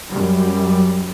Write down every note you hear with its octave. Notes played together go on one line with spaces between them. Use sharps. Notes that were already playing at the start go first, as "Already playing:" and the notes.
F#2 G3